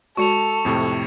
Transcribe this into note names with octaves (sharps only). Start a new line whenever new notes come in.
G#3 F#4 A4 C#6 C#7 F7
F2 A2 C3